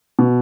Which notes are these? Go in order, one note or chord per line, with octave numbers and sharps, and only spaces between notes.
B2